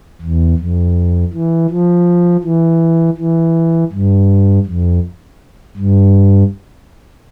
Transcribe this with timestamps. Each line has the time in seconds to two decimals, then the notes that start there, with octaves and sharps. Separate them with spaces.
0.21 E2
0.58 F2
1.33 E3
1.70 F3
2.43 E3
3.18 E3
3.92 G2
4.66 F2
5.77 G2